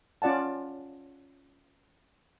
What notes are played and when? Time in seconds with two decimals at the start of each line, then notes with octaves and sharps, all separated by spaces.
0.22 C#4 F4 D5 F#5 A5